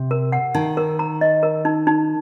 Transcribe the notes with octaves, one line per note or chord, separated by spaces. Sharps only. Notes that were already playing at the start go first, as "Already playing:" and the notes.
Already playing: C3
A#4
F#5
D#3 D#4
A#4
A#5
D#5
A#4
D#4
D#4